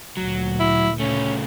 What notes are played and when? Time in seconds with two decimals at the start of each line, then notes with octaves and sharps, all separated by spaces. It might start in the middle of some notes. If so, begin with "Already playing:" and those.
0.17 D2 A#2 F#3
0.60 E4
1.00 C#3 A3 C#4